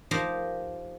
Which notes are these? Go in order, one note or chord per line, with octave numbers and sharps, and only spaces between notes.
F3 D#4 G4 A#4